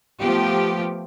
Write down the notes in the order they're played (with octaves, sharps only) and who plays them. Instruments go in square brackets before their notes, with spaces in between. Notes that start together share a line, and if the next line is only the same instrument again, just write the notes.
[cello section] F3 A3 B3 G4